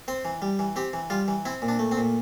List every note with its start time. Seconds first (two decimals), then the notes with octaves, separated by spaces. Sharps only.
0.08 C4 C5
0.25 E3
0.42 G3
0.59 E3
0.76 C4 G4
0.93 E3
1.10 G3 F4
1.28 E3
1.46 C4 E4
1.62 A#2
1.68 D4
1.79 A3
1.92 C4
1.97 A#2